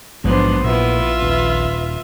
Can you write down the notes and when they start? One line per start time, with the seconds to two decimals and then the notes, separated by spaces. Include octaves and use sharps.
0.24 A#1 G#2 F3 F#3 G#3 B3 D4 C5
0.64 A#2 B3 E4 F4 E5
1.22 D#1 B4